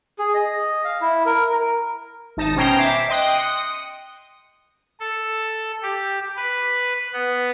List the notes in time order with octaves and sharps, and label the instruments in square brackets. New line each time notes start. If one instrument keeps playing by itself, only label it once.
[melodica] G#4
D#5
F5
E4
A#4
[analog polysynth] G#1 D#4 A5 A#6
B2 C#4 C5 G5 A#5
E5 D6 C7
D#5 G5 C6 D#6 F#6
D#6 C#7
[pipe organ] A4
G4
B4
B3